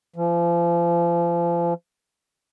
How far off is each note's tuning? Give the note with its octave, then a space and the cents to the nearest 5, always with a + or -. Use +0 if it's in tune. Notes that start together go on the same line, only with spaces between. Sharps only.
F3 -35